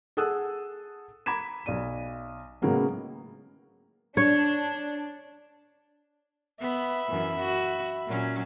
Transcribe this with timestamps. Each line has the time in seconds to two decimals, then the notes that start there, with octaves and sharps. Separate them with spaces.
0.17 G#4 A4 F#5 D#6 E6 F#6
1.26 A#5 B5 D6 G#6 B6 E7
1.66 B1 D5 D#7
2.62 A2 C#3 F#3 G#3 A#3 B3
4.17 D4 C#5
6.60 B3 E5 B5
7.09 F#2 E3
7.39 F#4
8.06 A#2 F#3 C#4